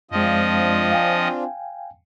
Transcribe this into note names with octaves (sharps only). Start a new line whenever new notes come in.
F#2 F3 G#3 C4 D4 F4 D#5
F5 G5 G#5